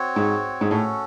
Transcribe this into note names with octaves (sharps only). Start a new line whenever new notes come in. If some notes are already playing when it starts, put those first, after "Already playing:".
Already playing: C4 F#4 C#5
G#2
G#2
A2 C#4 F#4 A4